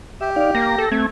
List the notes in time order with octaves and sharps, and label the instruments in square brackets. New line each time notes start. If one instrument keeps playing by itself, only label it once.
[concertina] G4 [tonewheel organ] E5
[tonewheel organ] D#4 D5 F5
[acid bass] A#3 [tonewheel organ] A#6
[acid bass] A4
[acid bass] A3 [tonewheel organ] C4 G#6